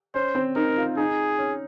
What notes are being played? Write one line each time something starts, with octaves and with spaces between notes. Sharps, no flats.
C#4 C5
C4
D#4 A#4
F4
D#4 G#4
C#4